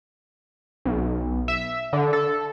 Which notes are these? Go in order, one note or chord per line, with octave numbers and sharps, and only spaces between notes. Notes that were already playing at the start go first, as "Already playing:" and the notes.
B1
E5
D3
A4